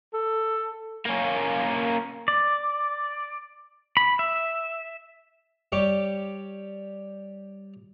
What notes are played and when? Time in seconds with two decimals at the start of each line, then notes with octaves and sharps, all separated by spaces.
0.14 A4
1.05 A#3 C#4
2.28 D5
3.97 B5
4.19 E5
5.72 G3 G4 C#5